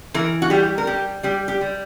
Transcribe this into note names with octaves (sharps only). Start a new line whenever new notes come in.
E3 A#4
F#4
G3 G4
A#4
G3 G4
G3 G4
G4
G3